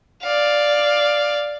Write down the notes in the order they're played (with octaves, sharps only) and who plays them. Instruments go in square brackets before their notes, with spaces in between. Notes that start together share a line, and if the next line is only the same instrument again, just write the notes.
[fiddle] D5 F5